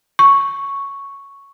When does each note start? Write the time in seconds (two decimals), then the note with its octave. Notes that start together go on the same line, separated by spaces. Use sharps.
0.19 C#6